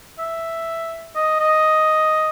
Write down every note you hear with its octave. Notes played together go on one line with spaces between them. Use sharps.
E5
D#5
D#5